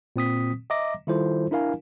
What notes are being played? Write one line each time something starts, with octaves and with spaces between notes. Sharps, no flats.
A#2 C4 D#6 B6
D#5 E5 A#5 D6 A#6
D#3 G3 E4 F4 A4 C5
D4 E4 A#4 F5 G#5